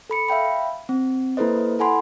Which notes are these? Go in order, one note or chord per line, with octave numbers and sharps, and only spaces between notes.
A4 B5 C#7
E5 F5 G5 B5
C4
A#3 E4 A4 B4 C5 D#5
E4 A4 F#5 G#5 B5 C6